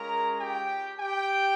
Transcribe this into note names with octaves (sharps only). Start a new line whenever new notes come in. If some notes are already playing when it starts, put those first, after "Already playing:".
Already playing: G#3 C#4 F4 A#4 A#5
G4 G5
G4 G5